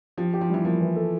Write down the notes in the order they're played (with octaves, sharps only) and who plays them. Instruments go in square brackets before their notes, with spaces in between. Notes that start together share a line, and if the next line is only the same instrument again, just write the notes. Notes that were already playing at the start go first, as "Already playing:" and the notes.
[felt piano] F3 [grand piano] G4
[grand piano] G4
[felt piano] F3
[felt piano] E3 [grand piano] G3
[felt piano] F3 [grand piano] A#3
[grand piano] E3
A4